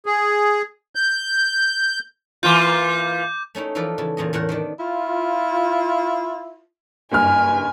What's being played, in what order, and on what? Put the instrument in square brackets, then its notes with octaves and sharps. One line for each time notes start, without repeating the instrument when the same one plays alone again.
[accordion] G#4
G6
[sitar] E3 A#3 F4 [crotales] D6 G6
[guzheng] A3 C#4 D#4 E4
E3 F3 D#4 A4 B4 D5
C#3 E3 A4
E2 A#2 C#4 D#5
E2 A2 A#4 F#5
D#3 B3 D4
[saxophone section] E4 F4
[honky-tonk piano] F#1 G2 F6 [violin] G#5